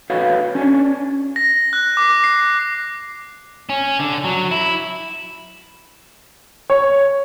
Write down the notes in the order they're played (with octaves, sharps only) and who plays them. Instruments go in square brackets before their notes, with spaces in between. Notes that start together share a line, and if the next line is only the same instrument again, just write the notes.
[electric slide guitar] F#4 A4 B4 C#5 F5
C#4 D4 C#5
[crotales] A#6
F#6
D6
C7
[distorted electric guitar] C#4
D3
F#3
E4
[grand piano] C#5